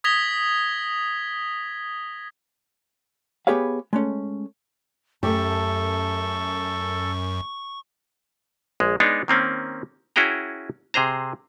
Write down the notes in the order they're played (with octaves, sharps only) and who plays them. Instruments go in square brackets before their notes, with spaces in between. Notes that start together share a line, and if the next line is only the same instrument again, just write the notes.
[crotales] D#6 G#6 A#6 B6 F7 G7
[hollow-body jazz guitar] B3 G4 G#4 B4 C#5 F5
G#3 A3 C#4
[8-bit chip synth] F#2 [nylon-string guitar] A3 G4 [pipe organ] A4 [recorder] C#6
[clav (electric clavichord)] A#1 G#3
G#3 B3 D4 D#4 C#5
D#3 A#3 C4 C#4
C#4 E4 F#4 G#4 G5 A#5
C3 G#4 C5 A#5